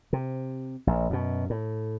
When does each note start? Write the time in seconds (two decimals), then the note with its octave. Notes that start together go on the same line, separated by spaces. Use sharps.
0.13 C3
0.87 A#1
1.10 F#2 B2
1.50 A2